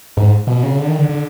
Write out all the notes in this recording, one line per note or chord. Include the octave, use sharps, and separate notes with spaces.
G#2
B2
C#3
D3
D#3
D3
D3